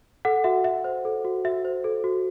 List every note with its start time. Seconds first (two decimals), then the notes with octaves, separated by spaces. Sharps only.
0.25 A4 F#5
0.44 F#4 E5
0.64 F#4 E5
0.84 C5
1.05 A4
1.25 F#4
1.45 F#4 E5
1.65 C5
1.84 A4
2.04 F#4